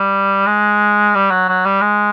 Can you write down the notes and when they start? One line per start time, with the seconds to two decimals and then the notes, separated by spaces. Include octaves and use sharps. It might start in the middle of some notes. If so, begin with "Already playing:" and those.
Already playing: G3
0.46 G#3
1.15 G3
1.30 F#3
1.48 F#3
1.65 G3
1.81 G#3